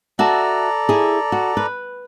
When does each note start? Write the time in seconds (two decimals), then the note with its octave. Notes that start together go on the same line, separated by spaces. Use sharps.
0.19 F#4 A4 D5 E5 A5 A#5
0.89 E4 G#4
1.32 F#4
1.57 B4